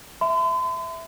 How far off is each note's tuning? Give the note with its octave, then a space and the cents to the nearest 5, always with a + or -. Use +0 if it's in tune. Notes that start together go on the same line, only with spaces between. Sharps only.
E5 +0 C6 -45